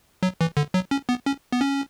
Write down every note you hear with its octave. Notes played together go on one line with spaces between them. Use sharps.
F#3
E3
D3
F#3
C#4
B3
C#4
B3
C#4